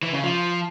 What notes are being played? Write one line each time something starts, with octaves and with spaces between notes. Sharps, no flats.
E3
C#3
F3